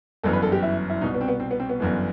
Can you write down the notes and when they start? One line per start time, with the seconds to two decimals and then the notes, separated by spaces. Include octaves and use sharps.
0.23 G1 F#2 E3 A4
0.33 B4
0.43 A4
0.52 G4
0.63 E4
0.90 E4
1.01 C2 B2 D#4
1.14 B3
1.21 C4
1.28 B3
1.40 C4
1.51 B3
1.60 C4
1.69 B3
1.80 G1 F#2 E3